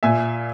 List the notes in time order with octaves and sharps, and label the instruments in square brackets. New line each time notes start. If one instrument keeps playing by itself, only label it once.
[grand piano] A#2 E5 G#5